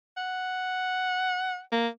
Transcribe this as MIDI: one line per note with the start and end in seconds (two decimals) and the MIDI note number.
0.17 1.59 78
1.72 1.88 58